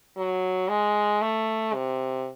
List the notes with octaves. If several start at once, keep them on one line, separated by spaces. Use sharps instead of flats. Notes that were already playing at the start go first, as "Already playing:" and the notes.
F#3
G#3
A3
C3